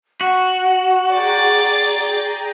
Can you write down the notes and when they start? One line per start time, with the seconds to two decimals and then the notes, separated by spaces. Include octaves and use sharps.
0.21 F#4 F#5
1.12 G#4 D5 G5 A#5 A6